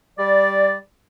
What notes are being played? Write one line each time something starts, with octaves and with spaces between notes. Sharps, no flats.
G3 D5